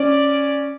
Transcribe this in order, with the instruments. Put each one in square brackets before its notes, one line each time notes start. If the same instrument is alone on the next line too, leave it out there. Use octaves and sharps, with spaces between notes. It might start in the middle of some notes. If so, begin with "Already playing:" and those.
Already playing: [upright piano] C#4 [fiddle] D5